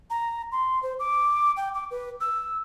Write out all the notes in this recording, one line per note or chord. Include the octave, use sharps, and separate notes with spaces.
A#5
C6
C5
D6
G5
D6
B4
E6